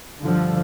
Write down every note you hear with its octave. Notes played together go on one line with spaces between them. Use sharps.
G2 D3 F3